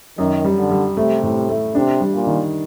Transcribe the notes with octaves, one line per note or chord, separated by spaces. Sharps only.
F#2 D#3
G3
D3
G3
C3 A3
A2
A3
C3 D4
G3
A#2
D#3